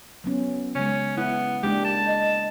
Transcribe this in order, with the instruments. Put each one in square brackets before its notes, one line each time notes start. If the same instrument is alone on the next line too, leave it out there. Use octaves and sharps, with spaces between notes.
[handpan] F#3 B3 C#4
[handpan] C#3 G#3 [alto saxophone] C#4
[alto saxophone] B3 [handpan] E4
[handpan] G#3 A#3 D4 [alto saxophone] G4
[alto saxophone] A5
[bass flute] D#5